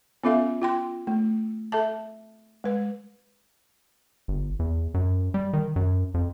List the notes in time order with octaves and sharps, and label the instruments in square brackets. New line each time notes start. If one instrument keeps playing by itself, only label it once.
[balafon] B3 C#4 F4 A4 E5 F5
F4 G5 C6
A3
A4 E5 A5
G#3 B4
[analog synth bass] G1
E2
F#2
G3
D#3
F#2
F2